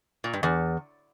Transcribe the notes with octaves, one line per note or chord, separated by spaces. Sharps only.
A#2
G2
E2